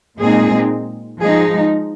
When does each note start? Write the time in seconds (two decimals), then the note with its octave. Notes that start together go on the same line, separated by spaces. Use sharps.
0.19 A#2 G#3 C4 D#4 G#4
1.21 F3 G#3 D#4 G#4